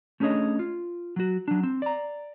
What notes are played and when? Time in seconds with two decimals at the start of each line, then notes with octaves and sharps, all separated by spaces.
0.20 A3 C#4 D4 G#4 C#5 D#5
0.59 F4
1.16 F#3 F#4
1.48 F#3 D4
1.63 C4
1.82 D5 A#5